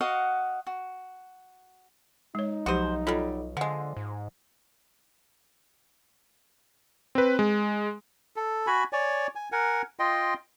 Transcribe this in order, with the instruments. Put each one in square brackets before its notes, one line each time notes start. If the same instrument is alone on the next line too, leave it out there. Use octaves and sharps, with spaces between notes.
[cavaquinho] F#4 D#5 F5 F#5
F#4
[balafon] G#3 C#5 [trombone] D#4
[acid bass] B1 [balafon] F3 F#3 G4 [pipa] F#4 C5
[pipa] F#3 G3 [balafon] F4 A4
[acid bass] D3 [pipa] F3 G#3 [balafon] F#5
[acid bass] G#2
[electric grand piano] C4 B4
G#3
[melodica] A4
F#4 G#5 B5
C#5 D5 G#5
G#5
A#4 F#5 G#5
F4 D#5 G5 C6